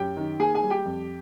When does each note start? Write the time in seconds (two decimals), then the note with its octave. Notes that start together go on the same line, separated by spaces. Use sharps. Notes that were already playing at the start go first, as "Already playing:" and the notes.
Already playing: F#2 G4 G5
0.17 D#3
0.40 A#3 G#4 G#5
0.55 G#4 G#5
0.63 G3
0.70 G4 G5
0.85 F2